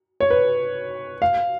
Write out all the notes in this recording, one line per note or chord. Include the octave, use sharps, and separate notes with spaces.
C#5
B4
F5